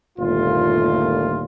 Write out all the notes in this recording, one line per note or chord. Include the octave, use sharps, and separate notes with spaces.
G1 D#2 A#2 A3 F4